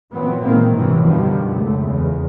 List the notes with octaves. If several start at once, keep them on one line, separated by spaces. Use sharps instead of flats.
A#2 E3 F#3 B3 C4
A#2 D#3 E3 G#3 A#3 C4
G1 G#2 C3 D#3 E3 F#3
F#2 B2 D3 D#3 F3 G3
F1 C#2 F#2 A3
E2 C#3 G#3